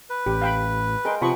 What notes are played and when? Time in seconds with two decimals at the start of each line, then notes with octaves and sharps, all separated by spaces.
0.10 B4
0.26 A1 G4
0.42 F5 G5 B5
1.05 G#3 A#4 C5 G5
1.21 C3 F3 B3 D#5 B5 C#6 D#6